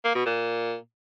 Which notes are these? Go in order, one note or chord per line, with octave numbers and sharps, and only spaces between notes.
A#3
B2
A#2